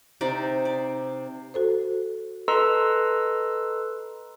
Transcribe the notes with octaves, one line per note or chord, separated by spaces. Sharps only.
C3 D#4 D5
D5
F#4 A4 C5
A4 B4 D#5 A#5 C6 E6